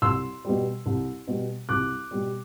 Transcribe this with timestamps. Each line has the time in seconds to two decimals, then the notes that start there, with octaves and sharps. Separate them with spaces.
0.02 C2 C6 E6
0.45 B2 G3
0.86 C2
1.27 B2 G3
1.69 C2 D6 F#6
2.11 B2 G3